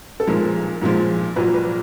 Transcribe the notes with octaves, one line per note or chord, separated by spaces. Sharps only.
A4
B1 A#2 F3 G#3 A#4
B1 A#2 F3 G#3
A#1 A#2 F#3 B4
B4